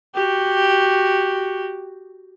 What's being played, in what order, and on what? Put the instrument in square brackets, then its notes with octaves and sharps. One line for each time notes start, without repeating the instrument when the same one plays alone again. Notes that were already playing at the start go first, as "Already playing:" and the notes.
[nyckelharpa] F#4 G4